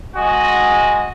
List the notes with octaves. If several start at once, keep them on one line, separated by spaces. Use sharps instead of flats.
G#3 F#4 D#5 G#5